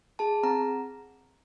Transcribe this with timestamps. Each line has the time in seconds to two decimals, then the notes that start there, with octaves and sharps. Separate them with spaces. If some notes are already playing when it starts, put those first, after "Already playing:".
0.19 G#4 A5
0.43 C4 A#5